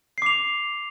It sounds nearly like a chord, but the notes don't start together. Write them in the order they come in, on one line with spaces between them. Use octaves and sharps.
C7 D6 F7